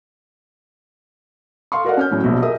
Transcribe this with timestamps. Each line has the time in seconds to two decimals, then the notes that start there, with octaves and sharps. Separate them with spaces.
1.72 A4 F5 C6 C#6
1.85 F#4 A#4 D5 D#5 F5 F#5
1.97 C#4 F6 G6
2.11 A2 F#3 C#4
2.23 A#1 B2
2.42 G#4 A#4 D#5 E5 D#6